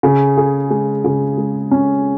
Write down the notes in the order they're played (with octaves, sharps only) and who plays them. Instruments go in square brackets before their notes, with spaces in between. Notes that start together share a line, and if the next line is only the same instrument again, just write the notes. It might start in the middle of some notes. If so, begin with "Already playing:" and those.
[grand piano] C#3
G#4
G#3
C#3
G#3
C#4